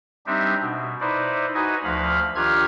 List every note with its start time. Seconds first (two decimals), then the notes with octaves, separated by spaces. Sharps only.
0.26 G3 C4 D4 D#4 G4 E5
0.61 B2
1.00 D#4 E4 B4 C5 D5
1.54 D#4 F#4 B4 D#5 G#5
1.84 D2 F3 F5 B5
2.35 D#3 D4 F4 G4 F6 G#6